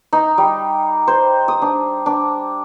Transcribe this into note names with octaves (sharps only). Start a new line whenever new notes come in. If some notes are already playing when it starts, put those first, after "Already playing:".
D#4
G3
C5
D#6
D4
D4